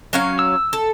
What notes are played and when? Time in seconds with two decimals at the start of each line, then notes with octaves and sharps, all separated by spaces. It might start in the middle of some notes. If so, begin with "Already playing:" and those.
0.13 F#3 C#4 F5
0.39 E6
0.73 A4